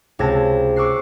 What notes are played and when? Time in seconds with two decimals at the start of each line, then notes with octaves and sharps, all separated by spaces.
0.19 C#2 C3 C4 A5 G#6 A#6
0.76 C#6 D6 E6 F#6 C7